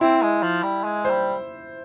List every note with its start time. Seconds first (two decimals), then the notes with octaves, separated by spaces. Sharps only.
0.01 C4 E4
0.22 G#3
0.42 F3
0.63 G3
0.84 G#3
1.05 C5
1.11 G3